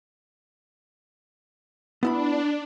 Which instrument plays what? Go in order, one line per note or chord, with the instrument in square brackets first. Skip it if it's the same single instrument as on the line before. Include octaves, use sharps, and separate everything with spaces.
[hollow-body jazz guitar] B3 E4 B5 [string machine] D4